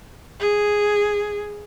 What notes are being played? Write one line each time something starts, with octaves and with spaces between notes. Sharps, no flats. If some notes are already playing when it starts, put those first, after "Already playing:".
G#4